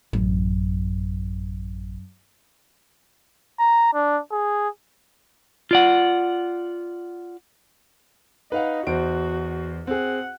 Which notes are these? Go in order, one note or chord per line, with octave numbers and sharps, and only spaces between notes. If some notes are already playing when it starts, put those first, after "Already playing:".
A1 F#2
A#5
D4
G#4
F4 D5 F#5
D#4 B4 F5 F#5
E2 F#4 C5 D7
C4 G#4 F#5